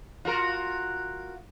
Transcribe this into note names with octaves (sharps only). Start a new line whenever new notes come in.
F4 F#4 A#4